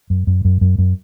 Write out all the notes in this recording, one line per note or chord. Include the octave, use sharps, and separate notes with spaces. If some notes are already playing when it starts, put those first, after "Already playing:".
F#2
F#2
F#2
F#2
F#2